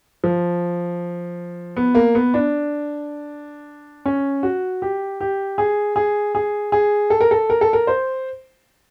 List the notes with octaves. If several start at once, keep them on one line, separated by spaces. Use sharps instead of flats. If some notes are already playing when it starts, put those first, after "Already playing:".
F3
B3
A#3
B3
D4
C#4
F#4
G4
G4
G#4
G#4
G#4
G#4
A4
A#4
A4
A#4
A4
A#4
C5